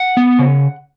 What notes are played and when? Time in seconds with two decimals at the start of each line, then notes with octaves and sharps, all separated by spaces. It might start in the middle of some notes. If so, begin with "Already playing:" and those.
Already playing: F#5
0.17 B3
0.39 C#3